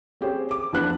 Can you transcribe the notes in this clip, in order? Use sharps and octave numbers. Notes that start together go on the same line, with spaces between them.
C4 C#4 G4 G#4 C5 C#5
D6
E2 F3 B3 D4 B4 F#6